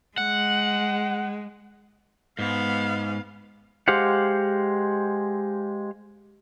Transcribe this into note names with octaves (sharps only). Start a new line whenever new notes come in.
G#3 F#5
G#2 B3 F5
G#3 G4 C5 F5 F#5